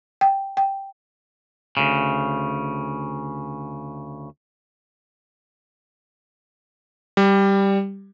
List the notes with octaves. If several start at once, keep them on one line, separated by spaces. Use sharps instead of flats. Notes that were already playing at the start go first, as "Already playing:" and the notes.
G5
G5
D2 C#3
G3